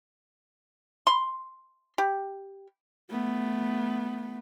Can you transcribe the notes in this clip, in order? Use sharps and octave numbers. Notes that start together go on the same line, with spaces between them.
C6
G4
A3 B3